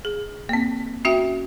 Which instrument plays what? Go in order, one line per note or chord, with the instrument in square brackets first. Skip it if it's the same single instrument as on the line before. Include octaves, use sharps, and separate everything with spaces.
[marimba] G#4
A#3 C4
C#4 F#4 E5 G5